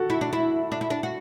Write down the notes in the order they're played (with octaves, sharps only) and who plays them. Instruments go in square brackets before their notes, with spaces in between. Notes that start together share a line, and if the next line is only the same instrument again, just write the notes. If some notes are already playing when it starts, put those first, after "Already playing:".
Already playing: [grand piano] F#4 A4
[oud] E4
D4
E4
D4
E4
D4
F#4